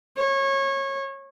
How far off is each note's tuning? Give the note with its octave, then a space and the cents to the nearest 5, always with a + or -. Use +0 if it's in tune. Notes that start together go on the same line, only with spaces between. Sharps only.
C#5 -25